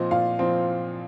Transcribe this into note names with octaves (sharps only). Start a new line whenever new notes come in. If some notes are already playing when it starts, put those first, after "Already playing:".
Already playing: A#2 F3 C4 D#5
A#2 F5
F3 C4